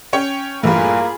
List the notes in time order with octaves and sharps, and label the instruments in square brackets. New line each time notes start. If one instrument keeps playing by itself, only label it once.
[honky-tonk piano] C#4 C#5 G5
[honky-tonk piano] A#1 G2 [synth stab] E3 A3 [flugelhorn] A#3 [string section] F4 G#4 B5